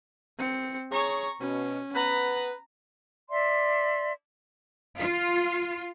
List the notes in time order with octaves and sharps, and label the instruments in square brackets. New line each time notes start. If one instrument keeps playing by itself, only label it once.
[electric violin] C4 C#7
[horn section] G#4 C#5 [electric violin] A#5 C#6
[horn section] B2 [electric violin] C#4
[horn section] B3 B4 [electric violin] A#5
[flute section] D5 E5 C6
[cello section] F4